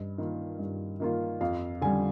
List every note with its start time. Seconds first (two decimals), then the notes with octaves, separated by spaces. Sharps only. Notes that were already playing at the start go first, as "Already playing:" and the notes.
Already playing: G2 D#5
0.18 D#3 A#3 F4
0.59 G2
1.00 D#3 A#3 F4
1.41 F2 F5
1.81 D3 G3 G#5